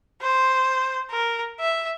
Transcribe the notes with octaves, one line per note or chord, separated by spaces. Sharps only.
C5
A#4
E5